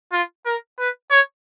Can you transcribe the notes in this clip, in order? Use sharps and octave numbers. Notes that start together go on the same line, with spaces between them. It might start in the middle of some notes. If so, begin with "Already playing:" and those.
F4
A#4
B4
C#5